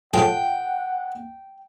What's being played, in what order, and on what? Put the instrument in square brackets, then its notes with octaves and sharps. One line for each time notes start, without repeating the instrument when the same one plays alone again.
[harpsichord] A2 F3 G#4 [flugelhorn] F#5 [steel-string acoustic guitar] G5